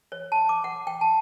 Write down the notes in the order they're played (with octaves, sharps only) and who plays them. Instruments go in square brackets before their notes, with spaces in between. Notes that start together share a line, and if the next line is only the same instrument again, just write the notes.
[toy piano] C#5
A5
D6
F#5
G5
A5